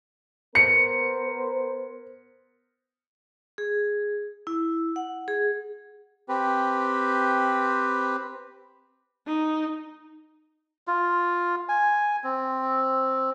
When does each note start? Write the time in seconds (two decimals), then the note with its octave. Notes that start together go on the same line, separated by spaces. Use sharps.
0.55 B3 A#4 C5 C#7
3.58 G#4
4.47 E4
4.96 F#5
5.28 G#4
6.29 C4 G4 B4
9.26 D#4
10.87 F4
11.69 G#5
12.24 C4